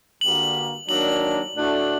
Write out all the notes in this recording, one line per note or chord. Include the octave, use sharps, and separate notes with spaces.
G2 D3 G3 A#3 F#4 F#7
D#3 F#3 A#3 D4 F#7
A2 A3 D4 F#4